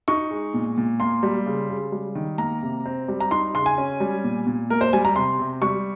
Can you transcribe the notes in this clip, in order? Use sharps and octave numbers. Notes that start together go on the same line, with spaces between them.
D#4 C#6
G#3
A#2
A#2
A#3 C6
G3
C#3
C#3
G3
D#3
A#3 A#5
C3
C4
G3
A#5
D#4 C6
C#3 C6
G#5
C#4
G3
A#2
A#2
A#3 A#4
C5
G3 G#5
A#5
C3 C6
C3
G3 C#6